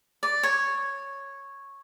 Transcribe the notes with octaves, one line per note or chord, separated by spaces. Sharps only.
D5
C#5